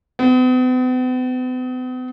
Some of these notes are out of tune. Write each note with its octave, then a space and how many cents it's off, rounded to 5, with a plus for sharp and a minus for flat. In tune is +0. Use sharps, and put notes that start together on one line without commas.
B3 +45